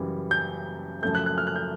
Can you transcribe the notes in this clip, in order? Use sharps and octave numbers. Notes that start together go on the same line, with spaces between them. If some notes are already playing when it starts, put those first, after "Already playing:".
Already playing: F#2 C#3 E3 G3
G6
F#2 C#3 F3 A3 G6
F#6
F#6
F6
F#6
G6